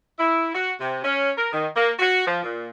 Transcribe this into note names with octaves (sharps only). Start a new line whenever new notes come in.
E4
F#4
C3
C#4
A#4
D#3
A#3
F#4
F3
A#2